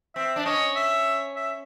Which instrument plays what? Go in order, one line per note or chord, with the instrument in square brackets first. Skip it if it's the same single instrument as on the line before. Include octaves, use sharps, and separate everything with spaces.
[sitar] C4 [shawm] E5
[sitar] D4
[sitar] C#4 [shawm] D#5
[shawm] E5
E5